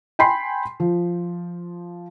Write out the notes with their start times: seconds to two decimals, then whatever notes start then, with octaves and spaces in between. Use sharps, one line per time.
0.19 G5 G#5 B5 C6 C7
0.80 F3